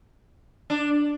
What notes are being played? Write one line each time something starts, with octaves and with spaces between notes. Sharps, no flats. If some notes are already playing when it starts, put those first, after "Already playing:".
D4